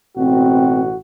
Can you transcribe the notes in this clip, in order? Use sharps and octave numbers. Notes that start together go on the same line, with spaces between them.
A1 B2 C4 F#4